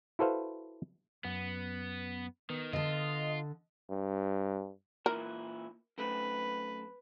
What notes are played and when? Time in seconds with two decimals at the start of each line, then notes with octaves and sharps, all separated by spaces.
0.19 E4 F#4 A4 B4 C5 F5
1.24 F#2 B3 F#5
2.50 D#3 B3
2.73 D3 F4 D#5 A5
3.90 G2
5.06 A#2 E3 E4 A#4
5.98 F#2 A3 C4 B4